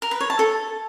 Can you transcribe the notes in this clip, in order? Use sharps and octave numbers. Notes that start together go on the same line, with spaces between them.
A#4
B4
C#5
A5
A4